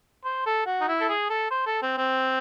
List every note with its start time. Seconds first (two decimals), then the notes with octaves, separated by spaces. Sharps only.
0.25 C5
0.46 A4
0.66 F#4
0.81 D#4
0.88 E4
1.01 A4
1.09 G#4
1.30 A4
1.51 C5
1.66 A4
1.82 C4
1.98 C4